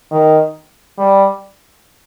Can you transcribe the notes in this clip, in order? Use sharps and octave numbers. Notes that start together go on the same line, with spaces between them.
D#3
G3